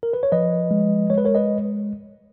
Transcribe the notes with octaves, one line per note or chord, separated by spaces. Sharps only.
A#4
B4
C#5
F3 B4 D#5
G#3
G#3 C#5
B4
A#4 C#5
B4 D#5